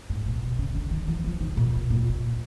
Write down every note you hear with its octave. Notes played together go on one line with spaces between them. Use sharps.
G#2
A#2
B2
C#3
D3
D#3
E3
F3
D#3
A#2
A#2